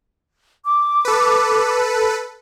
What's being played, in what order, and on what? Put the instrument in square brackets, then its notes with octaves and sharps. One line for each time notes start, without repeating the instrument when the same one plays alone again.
[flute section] D6
[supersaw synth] A4 B4